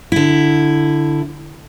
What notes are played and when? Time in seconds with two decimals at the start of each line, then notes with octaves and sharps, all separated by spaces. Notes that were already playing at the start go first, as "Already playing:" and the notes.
0.12 D3 E4